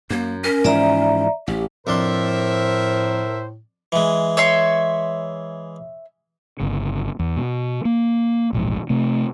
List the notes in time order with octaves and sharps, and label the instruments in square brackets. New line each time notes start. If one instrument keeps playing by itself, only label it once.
[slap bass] F#2 [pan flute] A#3
[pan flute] C#4 [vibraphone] A#4
[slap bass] G#2 E3 F3 [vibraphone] D5 E5 A#5
[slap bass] A1 [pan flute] G4
[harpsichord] F2 D4 C6 [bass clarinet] A2 [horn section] A#4 E5 [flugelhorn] C5
[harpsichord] E3 G#3
[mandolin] C#5 E5 C6
[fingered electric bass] G1 C#3
E2
B2
A#3
E1 A#1 G#2
C3 A3